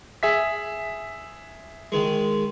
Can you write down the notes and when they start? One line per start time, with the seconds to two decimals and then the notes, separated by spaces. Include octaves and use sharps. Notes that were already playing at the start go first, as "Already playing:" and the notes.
0.23 G#4 E5 B6
1.92 D#3 G#3